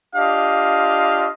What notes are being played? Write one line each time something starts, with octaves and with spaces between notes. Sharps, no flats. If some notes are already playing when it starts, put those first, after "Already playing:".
D4 F4 G4 D#5 F5